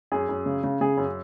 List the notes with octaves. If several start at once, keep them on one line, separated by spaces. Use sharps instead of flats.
F#2 G#4
F#2
C#3
C#3
C#3 G#4
F#2